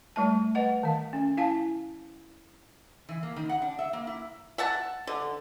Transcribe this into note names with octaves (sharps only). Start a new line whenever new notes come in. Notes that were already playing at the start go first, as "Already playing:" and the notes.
G3 A3 A5
B4 D#5 F#5
D#3 F5
C#4
E4 F5 G#5 A5
E3
A#3
D#3
F#5
D4
E5
A#3
E4
E5 F#5 A5
D3